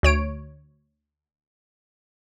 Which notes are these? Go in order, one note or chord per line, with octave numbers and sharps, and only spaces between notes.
D2 C#5 D7